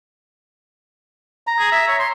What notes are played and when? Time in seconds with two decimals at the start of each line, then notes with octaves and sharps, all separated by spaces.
1.47 A#5
1.59 G#4
1.72 E5
1.88 C#5
1.99 C6